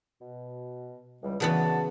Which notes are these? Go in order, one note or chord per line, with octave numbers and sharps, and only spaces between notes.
B2
C#2 E3 G3
C#3 E3 B3 D4 F#4 A5